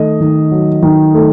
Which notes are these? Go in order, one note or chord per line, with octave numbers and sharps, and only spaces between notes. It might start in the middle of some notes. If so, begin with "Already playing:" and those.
Already playing: D#3 A3 D#5
D#3
F#3
D#3
A3